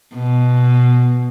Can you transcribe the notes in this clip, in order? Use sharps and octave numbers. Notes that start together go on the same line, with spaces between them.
B2